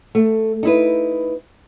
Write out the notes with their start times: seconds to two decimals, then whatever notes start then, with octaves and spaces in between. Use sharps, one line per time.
0.15 A3
0.63 D#4 E4 B4